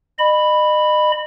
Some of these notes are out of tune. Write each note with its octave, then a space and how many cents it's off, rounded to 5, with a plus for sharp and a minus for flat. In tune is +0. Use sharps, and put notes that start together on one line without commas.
D#5 -35 B5 +0